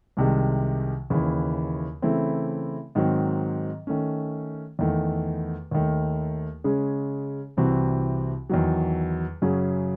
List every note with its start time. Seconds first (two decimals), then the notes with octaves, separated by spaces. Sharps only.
0.17 C2 C3 D#3 G#3
1.10 D#2 C#3 E3
2.02 C#3 E3 A3 C4 E4
2.95 G#2 D#3 F#3 C4
3.87 D#3 A3 C#4
4.79 E2 D#3 A3
5.71 D#2 D#3 A3
6.64 C#3 G#3 C#4 G#4
7.57 C2 C3 E3 C4 F#4
8.50 E2 D#3 F#3
9.42 F#2 C#3 F#3 C#4 G#4